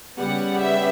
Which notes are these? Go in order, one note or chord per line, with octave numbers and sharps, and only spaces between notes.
C#3 G3 B3 F#5
E5